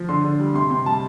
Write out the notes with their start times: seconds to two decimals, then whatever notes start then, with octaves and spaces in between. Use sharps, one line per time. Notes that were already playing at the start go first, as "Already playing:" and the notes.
Already playing: F3
0.09 D3 C6
0.24 D3
0.39 G3
0.54 C3 C6
0.70 C3 C6
0.86 G3 A5